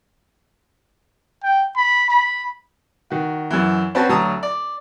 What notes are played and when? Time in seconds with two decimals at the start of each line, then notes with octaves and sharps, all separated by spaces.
1.43 G5
1.76 B5
2.11 B5
3.10 D#3 F#4
3.50 F#2 E3
3.95 C4 C#4 F#4 B4 C5 A5
4.09 D2 F#3 A5 A#5 D#6
4.43 D5